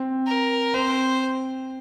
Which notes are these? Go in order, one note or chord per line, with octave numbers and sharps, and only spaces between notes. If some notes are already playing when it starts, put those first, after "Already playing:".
Already playing: C4
A#4
C4 C5